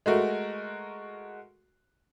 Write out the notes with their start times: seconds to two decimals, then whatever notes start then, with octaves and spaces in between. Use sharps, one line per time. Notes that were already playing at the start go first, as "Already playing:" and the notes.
0.06 G#3 A3 F#4 A#4